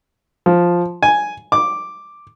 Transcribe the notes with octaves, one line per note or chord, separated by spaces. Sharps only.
F3
G#5
D6